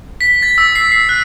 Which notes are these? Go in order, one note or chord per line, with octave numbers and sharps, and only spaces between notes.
B6
A6
E6
C7
C7
F#6